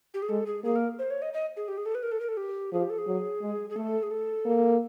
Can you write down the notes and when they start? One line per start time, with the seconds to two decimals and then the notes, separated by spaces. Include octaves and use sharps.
0.14 G4
0.22 G#4
0.29 G#3 A4
0.46 G#4
0.64 A#3 G#4
0.76 A#4
0.99 C5
1.10 C#5
1.22 D#5
1.34 D#5
1.57 G#4
1.68 G4
1.78 G#4
1.86 A4
1.95 B4
2.03 A#4
2.12 A4
2.20 A#4
2.29 A4
2.37 G4
2.73 F3 G#4
2.81 G4
2.90 A4
2.98 G#4
3.07 F#3
3.42 G#3
3.70 G#4
3.76 A3 A4
4.03 G#4
4.11 A4
4.46 A#3